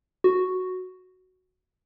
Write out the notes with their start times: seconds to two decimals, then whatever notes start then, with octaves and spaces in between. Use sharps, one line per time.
0.24 F#4